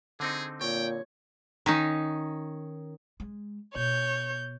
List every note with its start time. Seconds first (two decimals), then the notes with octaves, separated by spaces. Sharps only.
0.20 D3 C4 D#4 G#4
0.61 A#2 C#5 G5
1.66 D#3 C#4 D#4
3.20 G#3
3.75 B2 C#5 G6